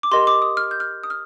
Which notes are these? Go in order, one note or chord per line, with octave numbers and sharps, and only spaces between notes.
D6
G4 A#4 D#5 C6
D6
D#6
F6
G6
F6
D#6
F6